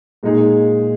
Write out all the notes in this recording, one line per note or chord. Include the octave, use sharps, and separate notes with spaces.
A#2 G#3 D#4 G#4